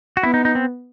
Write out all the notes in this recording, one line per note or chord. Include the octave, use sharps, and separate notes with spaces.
F#4
B3 E4
D#4
D#4
C4